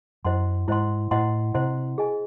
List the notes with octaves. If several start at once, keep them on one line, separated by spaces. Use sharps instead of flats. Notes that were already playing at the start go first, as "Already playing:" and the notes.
F#2 E4 C5 D#5 F#5 C6
G#2 E4 C5 D#5 F#5 C6
A2 E4 C5 D#5 F#5 C6
C3 E4 C5 D#5 F#5 C6
G#4 D#5 G#5